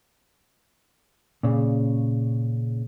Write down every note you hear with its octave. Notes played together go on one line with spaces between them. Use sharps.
A#2 C#3